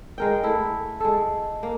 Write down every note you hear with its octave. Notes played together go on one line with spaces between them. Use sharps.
G#3 A#4 G5
A3 E4
G#3 A4
A#3